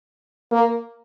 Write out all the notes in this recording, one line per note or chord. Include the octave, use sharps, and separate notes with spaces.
A#3